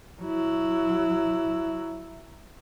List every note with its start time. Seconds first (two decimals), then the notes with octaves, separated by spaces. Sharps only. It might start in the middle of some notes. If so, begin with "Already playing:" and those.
0.22 F#3 E4